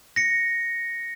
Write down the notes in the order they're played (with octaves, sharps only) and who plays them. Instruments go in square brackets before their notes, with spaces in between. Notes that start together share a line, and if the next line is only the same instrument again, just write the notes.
[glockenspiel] A#6 C#7